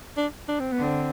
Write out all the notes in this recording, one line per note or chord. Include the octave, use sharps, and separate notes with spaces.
D4
D4
C4
B3
D3
C4